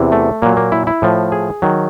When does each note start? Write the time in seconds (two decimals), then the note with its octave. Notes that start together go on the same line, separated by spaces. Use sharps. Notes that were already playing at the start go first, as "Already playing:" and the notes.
Already playing: E2 C3 E3
0.12 A3
0.42 A#2 F#3 A#3
0.57 A#3
0.72 E4
0.87 E4
1.02 A2 F3
1.32 G#4
1.62 D#3 F#3